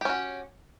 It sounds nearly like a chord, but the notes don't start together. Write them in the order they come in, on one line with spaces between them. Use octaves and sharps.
G4 C#4 F#4